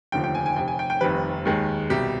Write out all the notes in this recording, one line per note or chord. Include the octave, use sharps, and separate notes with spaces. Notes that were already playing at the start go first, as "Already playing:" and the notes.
F1 D#2 D3 F3 G5
G5
G#5
G#5
F1 F2 C3 G5
G#5
G5
G5
F1 F2 D#3 G3 B4
D#2 D#3 G#3
C2 B2 G3 G4